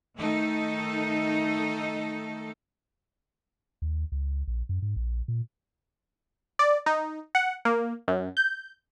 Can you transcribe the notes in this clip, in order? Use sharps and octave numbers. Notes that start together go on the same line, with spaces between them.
D#3 A3 D#4 A4
D#2
C#2
A#1
F#2
G#2
A#1
A#2
D5
D#4
F#5
A#3
F#2
G6